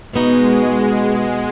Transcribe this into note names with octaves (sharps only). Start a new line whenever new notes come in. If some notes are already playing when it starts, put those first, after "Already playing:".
B2 G#3 B3 D#4 F#4